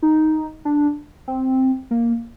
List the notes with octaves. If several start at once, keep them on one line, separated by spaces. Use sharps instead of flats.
D#4
D4
C4
A#3